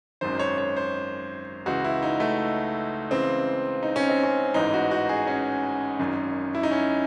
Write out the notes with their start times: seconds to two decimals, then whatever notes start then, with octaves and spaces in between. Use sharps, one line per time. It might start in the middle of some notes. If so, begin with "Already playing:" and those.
0.21 G#1 F#2 D#3 C5
0.39 C#5
0.58 C#5
0.77 C5
1.66 C#2 C#3 E3 F#4
1.85 E4
2.03 D#4
2.20 A3
3.11 C#2 C#3 E3 C4
3.83 D#4
3.96 C#4
4.10 C4
4.23 C#4
4.54 A1 G#2 E3 D#4
4.73 F#4
4.91 F#4
5.09 G#4
5.27 C#4
5.99 G#1 F#2 D#3
6.55 E4
6.63 D#4
6.72 C#4